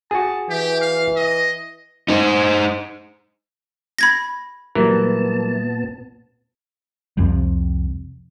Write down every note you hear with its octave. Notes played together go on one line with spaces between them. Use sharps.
F#4 G#4 A5
E3 G4
F5
D#5
D#4 C5
B5 G#6 A#6
A#2 E3 F#3 G3 A3 B3 A#4 A5
C2 F2 C3